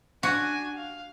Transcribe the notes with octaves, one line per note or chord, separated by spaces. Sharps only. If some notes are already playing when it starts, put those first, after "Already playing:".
D4 F#4 G#5
F5